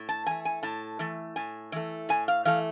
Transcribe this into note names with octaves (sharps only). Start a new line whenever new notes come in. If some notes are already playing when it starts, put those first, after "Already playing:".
Already playing: A2
A5
E3 A3 G#5
G#5
A2 A5
E3 A3
A2 G#5
E3 A3
A2 G#5
F5
E3 A3 F5